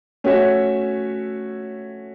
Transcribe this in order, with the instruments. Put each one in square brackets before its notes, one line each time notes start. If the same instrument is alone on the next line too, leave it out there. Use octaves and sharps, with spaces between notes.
[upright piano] A3 C#4 F#4 C#5 E5